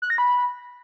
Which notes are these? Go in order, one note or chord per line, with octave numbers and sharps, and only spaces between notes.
F#6
A#6
B5